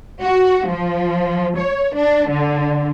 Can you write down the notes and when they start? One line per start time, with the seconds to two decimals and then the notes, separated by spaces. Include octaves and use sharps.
0.22 F#4
0.68 F3
1.58 C#5
1.95 D4
2.30 D3